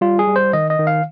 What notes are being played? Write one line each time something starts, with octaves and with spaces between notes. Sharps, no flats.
G3 F4
G#4
G3
C5
D#3 D#5
D#5
D#3
F5